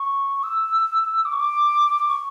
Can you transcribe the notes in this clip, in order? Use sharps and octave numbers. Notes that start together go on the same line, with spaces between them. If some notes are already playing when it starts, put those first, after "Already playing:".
Already playing: C#6
E6
D6
C#6
D6
C#6